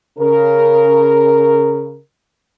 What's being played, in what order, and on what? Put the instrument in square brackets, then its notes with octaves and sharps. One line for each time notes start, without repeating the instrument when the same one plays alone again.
[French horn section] C#3 A#4